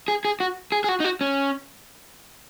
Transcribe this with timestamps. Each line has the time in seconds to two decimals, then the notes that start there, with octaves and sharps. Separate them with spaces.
0.08 G#4
0.25 G#4
0.40 F#4
0.72 G#4
0.84 G#4
0.89 F#4
1.00 D#4
1.04 F#4
1.21 C#4